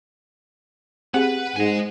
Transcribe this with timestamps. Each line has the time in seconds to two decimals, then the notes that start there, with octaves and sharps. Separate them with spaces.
1.14 C4 G4 G#4 B4 F#5
1.56 G#2 D#5 G#5